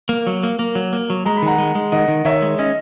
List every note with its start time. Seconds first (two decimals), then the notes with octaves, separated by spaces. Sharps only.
0.09 A#3
0.27 F#3
0.43 A#3
0.59 A#3
0.75 F#3
0.93 A#3
1.10 F#3
1.25 G#3 A#5
1.37 B5
1.42 D#3 F#5 A#5
1.58 G#3
1.75 G#3
1.92 D#3 D#5 F#5
2.08 D#3
2.25 D#3 C#5 E5
2.42 G#3
2.58 C#4 D#5